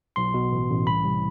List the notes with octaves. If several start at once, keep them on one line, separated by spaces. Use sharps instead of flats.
B1 C6
B2
A1
A1
C2 B5
C2